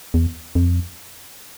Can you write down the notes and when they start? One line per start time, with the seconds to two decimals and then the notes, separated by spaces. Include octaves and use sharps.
0.14 E2
0.55 F2